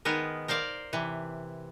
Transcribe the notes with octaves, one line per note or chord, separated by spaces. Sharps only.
D#3 G#3 B3 A#4
A#4 C5 D5 F5
C3 E3